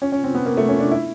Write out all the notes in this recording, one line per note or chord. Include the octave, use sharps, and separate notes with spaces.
C#4
C#4
C4
B3
A#3
A3
C#4
D4
E4